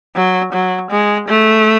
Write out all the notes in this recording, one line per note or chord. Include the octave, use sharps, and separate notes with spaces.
F#3
F#3
G#3
A3